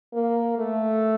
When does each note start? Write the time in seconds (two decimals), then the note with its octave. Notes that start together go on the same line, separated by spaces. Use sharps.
0.13 A#3
0.58 A3